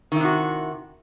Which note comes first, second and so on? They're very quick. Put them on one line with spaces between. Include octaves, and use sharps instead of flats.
D#3 E4 C3 F#4